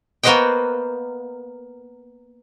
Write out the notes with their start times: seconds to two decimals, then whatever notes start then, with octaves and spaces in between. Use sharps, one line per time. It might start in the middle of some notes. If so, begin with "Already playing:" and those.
0.23 A#3 B3 F#4 C5 D#5 G5